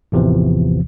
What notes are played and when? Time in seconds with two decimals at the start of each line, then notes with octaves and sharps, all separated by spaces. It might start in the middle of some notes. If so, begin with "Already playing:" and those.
0.12 A1 E2 C3 E3 F3